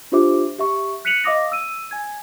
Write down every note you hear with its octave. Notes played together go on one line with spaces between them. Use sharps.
D4 F4 G4 C5 E5 D6
G4 E5 C#6
F#6 B6 C#7 D#7 F7 F#7
D#5 F5 D6 D#6 A#6
E6 D#7
G#5 G#6